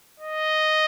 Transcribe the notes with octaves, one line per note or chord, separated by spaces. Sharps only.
D#5